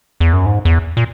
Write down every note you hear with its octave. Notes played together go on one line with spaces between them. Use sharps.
E2
F#2
G#2
E2
A#2